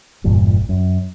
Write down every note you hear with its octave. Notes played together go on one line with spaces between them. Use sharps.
G1 E2 G2 A#2
F#2